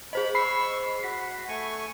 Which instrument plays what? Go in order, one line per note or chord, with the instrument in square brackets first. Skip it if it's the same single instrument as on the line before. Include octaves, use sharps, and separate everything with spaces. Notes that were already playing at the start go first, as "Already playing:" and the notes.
[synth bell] G#4 C5 D#5 [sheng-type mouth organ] B5
[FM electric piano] B5 C7 [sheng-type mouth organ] C#6 E6
[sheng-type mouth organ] F#4 [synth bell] B6
[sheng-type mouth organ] A3 G#5 C#6